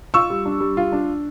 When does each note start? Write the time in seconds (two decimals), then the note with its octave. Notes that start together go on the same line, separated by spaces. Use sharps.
0.14 F4 C#6 E6
0.30 G3
0.46 D4
0.60 G3
0.77 F4
0.92 D4